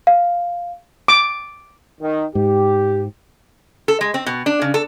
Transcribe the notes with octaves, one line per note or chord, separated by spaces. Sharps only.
F5
D6
D#3
G#2 G4
A4
G#3
C4
B2
D4
C#3
A4